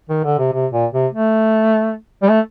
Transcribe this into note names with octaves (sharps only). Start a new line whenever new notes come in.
D#3
D3
C3
C3
A#2
C3
A3
G3
A3